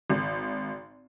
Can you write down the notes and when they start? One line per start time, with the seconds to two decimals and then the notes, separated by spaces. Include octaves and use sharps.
0.10 G#1